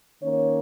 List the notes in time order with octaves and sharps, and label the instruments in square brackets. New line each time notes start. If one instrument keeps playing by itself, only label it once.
[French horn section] D#3 A#3 C#4 C#5